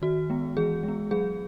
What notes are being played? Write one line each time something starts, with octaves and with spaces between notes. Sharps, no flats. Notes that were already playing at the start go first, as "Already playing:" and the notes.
D#3 F#4
G#3 B3
E3 G#4
G#3
B3
F#3 G#4